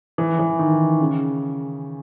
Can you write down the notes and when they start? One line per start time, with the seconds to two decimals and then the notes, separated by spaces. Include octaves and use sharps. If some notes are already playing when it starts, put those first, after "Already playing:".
0.18 E3
0.39 E3
0.59 D#3
1.00 C#3